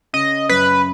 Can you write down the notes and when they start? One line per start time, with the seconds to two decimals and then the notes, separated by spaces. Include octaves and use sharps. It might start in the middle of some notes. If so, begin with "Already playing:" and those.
0.13 C#3 D#5
0.49 F#2 B4